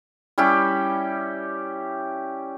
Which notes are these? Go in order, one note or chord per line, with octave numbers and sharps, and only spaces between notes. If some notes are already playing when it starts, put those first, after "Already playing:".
G3 C#4 E4 G4